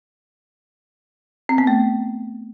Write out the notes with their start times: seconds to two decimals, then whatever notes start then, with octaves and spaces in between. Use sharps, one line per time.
1.49 C4
1.58 B3
1.67 A3